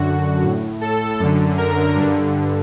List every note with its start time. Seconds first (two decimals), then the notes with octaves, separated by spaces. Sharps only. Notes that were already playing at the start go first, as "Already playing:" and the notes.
Already playing: F#2 D3 F#4
0.44 A2
0.81 A4
1.19 F#2 D3
1.58 A#4
1.96 G2 D3